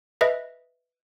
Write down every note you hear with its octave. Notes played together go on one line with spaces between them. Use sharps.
B4 D#5 E5